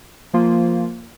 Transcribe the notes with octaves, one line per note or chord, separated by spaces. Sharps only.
F3 A#3 F4